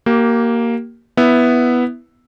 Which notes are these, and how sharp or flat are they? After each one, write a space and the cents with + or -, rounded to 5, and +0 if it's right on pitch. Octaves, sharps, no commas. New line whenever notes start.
A#3 +0 G4 -25
B3 +0 E4 +0 E5 +0